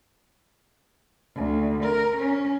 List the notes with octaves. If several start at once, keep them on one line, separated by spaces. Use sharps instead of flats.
D2
A#4
C#4